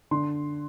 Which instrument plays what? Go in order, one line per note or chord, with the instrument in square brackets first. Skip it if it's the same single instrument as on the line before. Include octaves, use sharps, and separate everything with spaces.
[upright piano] D3 C6